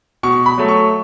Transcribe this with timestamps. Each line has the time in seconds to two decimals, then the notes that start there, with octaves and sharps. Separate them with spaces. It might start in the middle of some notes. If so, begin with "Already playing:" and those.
0.23 B2 C#6
0.46 B5
0.58 F#3 A3
0.68 C#6